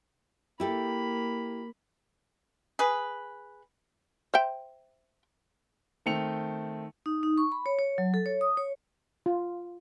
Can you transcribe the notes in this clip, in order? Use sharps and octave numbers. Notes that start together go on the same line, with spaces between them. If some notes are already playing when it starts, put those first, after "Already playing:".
A#3 E4 G4 A4 B5
G#4 B4
C5 E5 G5
D#3 A3 C4 G5 C#7 F7
D#4
D#4
C#6
B5
C#5
C#5
F#3
A4
C#5
D#6
C#5
F4